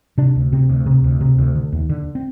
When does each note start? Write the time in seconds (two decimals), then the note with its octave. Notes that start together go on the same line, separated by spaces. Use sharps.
0.18 C3 D4
0.35 D2
0.52 C3 C4
0.70 D2
0.86 C3
1.04 D2
1.21 C3
1.39 D2
1.55 D3
1.72 D#2
1.89 D3
2.15 C4